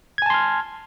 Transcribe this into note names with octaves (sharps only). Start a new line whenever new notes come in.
G#5 A5 C6 F6 G#6